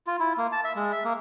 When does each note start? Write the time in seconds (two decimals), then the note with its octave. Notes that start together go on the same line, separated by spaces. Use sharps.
0.07 F4
0.20 E4
0.38 A#3
0.52 A5
0.65 E5
0.76 G#3
0.92 E5
1.05 A#3